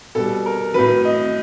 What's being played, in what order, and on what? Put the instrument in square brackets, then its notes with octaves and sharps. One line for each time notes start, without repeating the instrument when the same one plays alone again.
[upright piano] B2 G3 A4
A#4
A2 F#3 B4
D#5